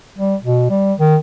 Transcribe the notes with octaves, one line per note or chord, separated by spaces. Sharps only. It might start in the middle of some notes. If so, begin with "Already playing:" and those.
G3
B2
G3
D#3